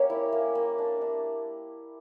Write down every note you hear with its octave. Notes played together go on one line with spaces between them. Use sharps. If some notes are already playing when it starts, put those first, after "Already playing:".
Already playing: A#3 C#4 G4 C#5
E4
A#3
A#3
D4
D4